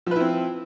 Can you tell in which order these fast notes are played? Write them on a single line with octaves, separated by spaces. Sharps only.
F3 B4 E4 C4